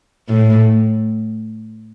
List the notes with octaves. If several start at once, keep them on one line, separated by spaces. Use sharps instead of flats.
A2